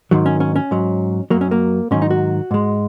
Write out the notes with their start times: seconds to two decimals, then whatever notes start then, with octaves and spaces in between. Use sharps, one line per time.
0.11 G#2 D#3 F#3
0.26 C#4
0.40 C#4
0.56 C#4
0.71 G#2 F#3
1.30 F#2 F#3 A#3
1.41 C#4
1.51 A#3
1.91 G#2 D#3 F#3 C#4
2.02 D#4
2.11 F#4
2.51 G#2 G#3